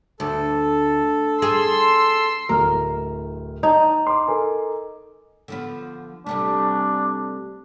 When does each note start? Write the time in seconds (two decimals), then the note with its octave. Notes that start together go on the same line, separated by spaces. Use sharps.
0.20 D2 A4
1.42 G#4 C6 E6
2.49 D1 A2 A#4 F6
3.63 D#4 A5
4.07 C6 D6
4.28 A4 A#4 G#5
5.48 D3 F3 B3
6.26 C3 G3 A3 D4